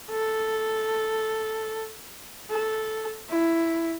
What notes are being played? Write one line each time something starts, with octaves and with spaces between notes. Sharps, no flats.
A4
A4
E4